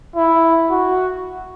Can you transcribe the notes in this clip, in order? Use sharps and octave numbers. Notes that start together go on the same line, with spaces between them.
E4
F#4